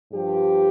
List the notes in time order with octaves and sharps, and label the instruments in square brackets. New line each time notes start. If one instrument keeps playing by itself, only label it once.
[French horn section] G2 F3 G4